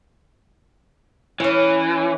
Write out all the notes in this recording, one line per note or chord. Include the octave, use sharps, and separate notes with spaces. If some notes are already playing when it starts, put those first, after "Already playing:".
E3 C#4 C#5